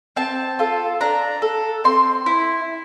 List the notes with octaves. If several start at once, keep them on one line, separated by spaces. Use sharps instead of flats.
C4 A5
F4 A4
D4 A#5
A4
C4 C6
E4